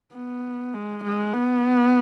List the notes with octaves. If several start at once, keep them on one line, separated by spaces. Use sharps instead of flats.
B3
G#3
G#3
B3